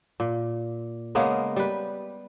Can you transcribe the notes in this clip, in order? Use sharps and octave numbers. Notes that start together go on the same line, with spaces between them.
A#2
C#3 G#3 A#3 B3
G3 B4